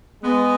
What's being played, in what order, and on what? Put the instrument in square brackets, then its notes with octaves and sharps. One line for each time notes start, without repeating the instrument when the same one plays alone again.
[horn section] G#3 B3